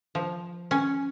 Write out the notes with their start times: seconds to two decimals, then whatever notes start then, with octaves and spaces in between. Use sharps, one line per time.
0.15 F3
0.71 C#4